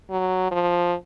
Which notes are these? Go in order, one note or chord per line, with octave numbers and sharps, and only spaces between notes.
F#3
F3